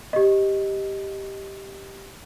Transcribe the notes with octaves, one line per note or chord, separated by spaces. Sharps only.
G4 D#5